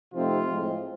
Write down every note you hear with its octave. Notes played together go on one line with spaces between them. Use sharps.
C3 F3 A3 C4 D#4 F4
A2 F3 G#3 C4